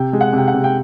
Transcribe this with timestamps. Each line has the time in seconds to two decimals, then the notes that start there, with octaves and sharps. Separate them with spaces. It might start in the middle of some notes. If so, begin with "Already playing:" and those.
Already playing: C3 G5
0.13 G#3
0.21 F#5
0.33 C3 G5
0.48 F#5
0.54 C3
0.64 G5